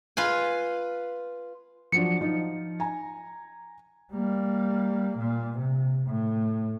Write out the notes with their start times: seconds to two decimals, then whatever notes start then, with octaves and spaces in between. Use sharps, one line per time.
0.17 F4 B4 G#5
1.92 F3 F#3 D4 C#7
2.21 F3 D#4 F4
2.80 G#5 A#5
4.13 G3 A#3
5.18 A#2
5.57 C3
6.07 A2